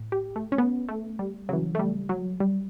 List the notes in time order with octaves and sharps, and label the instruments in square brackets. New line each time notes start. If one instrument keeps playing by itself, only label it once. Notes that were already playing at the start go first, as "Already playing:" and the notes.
Already playing: [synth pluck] A2
G4
A3
C#4
B3
A3
G3
C#3 E3 F#3
A3
G3
F#3
G3